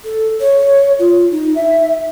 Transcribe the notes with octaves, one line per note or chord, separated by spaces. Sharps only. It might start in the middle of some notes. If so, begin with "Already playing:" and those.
A4
C#5
F4
D#4
E5